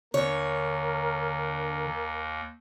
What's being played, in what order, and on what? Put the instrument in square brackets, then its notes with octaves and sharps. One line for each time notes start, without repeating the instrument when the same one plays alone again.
[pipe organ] D#2 [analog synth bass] D3 [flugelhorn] A#4 [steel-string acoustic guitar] C#5